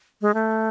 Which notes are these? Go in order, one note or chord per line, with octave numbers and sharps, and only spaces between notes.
G#3
A3